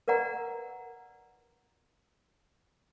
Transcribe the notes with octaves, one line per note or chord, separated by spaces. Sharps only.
A#4 B4 D5 F#5 A#5